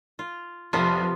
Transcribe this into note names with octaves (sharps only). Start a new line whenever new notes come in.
F4
F1 C3 F3 B3 F4 C6